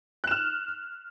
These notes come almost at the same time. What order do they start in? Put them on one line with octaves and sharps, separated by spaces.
F#6 E7 F6